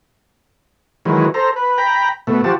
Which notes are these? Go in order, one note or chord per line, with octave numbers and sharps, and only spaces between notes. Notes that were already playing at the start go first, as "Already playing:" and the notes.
D#3 E3 F#3 G#3
A4 C5 A#5
B4
G5 A#5 B5
B2 A3
F3 F#4 G4 A5